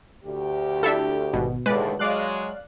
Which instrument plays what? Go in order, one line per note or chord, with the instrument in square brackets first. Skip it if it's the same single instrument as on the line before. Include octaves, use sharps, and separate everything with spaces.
[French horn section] D2 G4
[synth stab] D4 E4 [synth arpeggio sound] A4 E5
[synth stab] G#1 [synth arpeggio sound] B2
[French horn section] D#2 A2 D3 [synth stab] G#3 D5 [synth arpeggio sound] B4
[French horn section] F#3 G#3 [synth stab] D5 F5 F#6